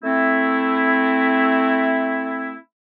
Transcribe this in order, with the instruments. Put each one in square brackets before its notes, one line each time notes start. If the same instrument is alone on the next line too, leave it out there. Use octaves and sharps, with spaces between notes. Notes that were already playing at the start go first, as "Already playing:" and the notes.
[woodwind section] A3 C4 E4